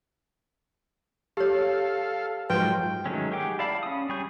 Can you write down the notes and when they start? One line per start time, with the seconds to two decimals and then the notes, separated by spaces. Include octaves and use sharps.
1.37 G4 A4 C#5 F5
2.50 G#2 F3 F#3 B4 G5
3.06 D#3 F#3 G#3 A3 C#4
3.32 G4 G#4 F#5 G5 D6
3.59 E4 D5 F5 A5 B5
3.83 C#4 D#6
4.09 G3 G#4 C#6 G6